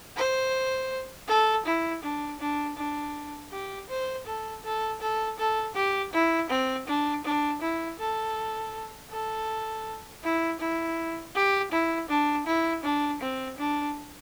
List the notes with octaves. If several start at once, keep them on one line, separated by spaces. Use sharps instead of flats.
C5
A4
E4
D4
D4
D4
G4
C5
A4
A4
A4
A4
G4
E4
C4
D4
D4
E4
A4
A4
E4
E4
G4
E4
D4
E4
D4
C4
D4